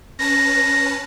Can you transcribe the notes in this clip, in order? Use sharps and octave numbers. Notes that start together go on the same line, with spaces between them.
C#4 B4 A5 A#6